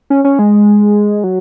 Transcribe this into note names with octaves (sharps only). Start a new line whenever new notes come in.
C#4
C#4
G#3
F#3